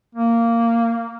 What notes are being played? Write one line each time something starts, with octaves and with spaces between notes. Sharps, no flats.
A#3